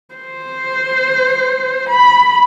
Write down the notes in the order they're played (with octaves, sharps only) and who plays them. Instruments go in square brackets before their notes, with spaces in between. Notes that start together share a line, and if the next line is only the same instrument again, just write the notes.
[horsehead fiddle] C5
B5